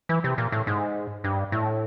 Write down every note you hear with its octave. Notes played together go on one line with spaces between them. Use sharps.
E3
C3
A#2
A2
G#2
G2
A2